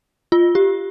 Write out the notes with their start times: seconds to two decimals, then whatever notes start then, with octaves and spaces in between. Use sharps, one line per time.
0.32 F4
0.55 G4